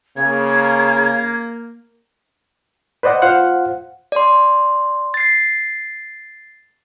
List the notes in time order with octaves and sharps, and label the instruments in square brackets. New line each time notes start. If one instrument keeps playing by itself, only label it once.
[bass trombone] C#3 [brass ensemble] A#3 [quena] G#6
[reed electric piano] B4 C5 D5 D#5 F#5
F4 C5 F5 F#5
[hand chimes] D5 C6
A6 C7